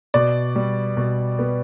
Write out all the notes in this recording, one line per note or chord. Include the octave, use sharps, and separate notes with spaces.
B2 D5
G3
B2
B3